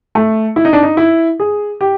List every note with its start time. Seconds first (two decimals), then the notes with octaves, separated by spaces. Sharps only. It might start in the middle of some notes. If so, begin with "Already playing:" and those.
0.15 A3
0.56 E4
0.65 D#4
0.73 D4
0.83 D#4
0.97 E4
1.40 G#4
1.81 G4